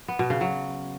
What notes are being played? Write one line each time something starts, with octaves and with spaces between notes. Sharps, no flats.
B3
B2
C#3
F#3